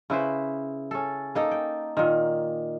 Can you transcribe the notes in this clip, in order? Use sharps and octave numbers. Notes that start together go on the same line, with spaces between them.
C#3 E4 B4 C5
C#4 A4
A#3 D#4 A4
G5
A#2 D#3